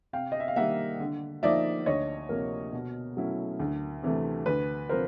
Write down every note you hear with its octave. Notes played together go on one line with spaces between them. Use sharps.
C3 F5 G5
D#5
E5
F5
D#3 G3 A#3 E5 F#5
D3
F3 A#3 D#4 D5 E5
D2 C#5 D#5
C3 F3 A#3 A#4
B2
F#3 A3 C#4 E4
D2
C3 E3 A3
D2 B4
C3 F3 A#4 C5